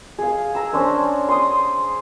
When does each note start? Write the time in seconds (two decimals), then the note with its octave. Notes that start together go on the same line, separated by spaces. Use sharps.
0.18 G#4 F5
0.55 A#5 E6
0.73 C#4 D4 C5 D5
1.29 C6 D#6